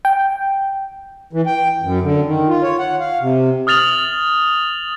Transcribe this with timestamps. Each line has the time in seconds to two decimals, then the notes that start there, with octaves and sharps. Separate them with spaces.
0.05 G5
1.33 E3
1.46 G5
1.82 F#2
2.02 D3
2.25 D#3
2.48 F4
2.63 C#5
2.79 F#5
3.00 F5
3.21 C3
3.67 D#6 F6 A6 F7 F#7